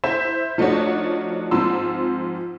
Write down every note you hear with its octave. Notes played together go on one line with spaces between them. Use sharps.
E4 C5 E5 B6 E7
F3 A3 D4 D#4 F#4 C#5
G#2 F3 C4 C6 E6